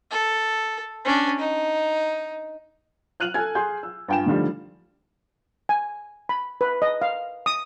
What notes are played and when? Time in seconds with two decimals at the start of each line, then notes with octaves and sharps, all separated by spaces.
0.11 A4
1.05 C#4 D4
1.39 D#4
3.20 F6 F#6 D#7 F7 F#7
3.34 A4 G#5 F6 G#6
3.55 G#4 C6 G6
3.83 E6
4.08 G2 F4 G5 G#5 E7
4.26 A2 D3 D#3 F3 G3
5.69 G#5
6.29 B5
6.61 B4
6.82 D#5
7.02 F5
7.46 D#6